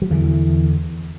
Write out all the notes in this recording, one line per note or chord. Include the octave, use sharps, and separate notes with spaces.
F#3
E2 D3 E3